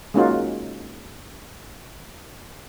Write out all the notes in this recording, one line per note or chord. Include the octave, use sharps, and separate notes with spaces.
G#3 A#3 C#4 D#4 F4 F#4